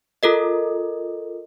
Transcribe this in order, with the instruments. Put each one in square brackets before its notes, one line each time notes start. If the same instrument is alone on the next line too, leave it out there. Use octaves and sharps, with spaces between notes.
[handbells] F4 A4 A#4 D#5